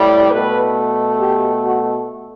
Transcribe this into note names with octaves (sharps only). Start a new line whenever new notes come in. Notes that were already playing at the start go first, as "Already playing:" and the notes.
Already playing: A2 G3
B2 A3 B4
G4
F#4